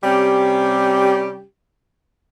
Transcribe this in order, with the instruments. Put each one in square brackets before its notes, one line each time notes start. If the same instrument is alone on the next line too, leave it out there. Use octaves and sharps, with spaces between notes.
[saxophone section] C3 G3 C#4 G4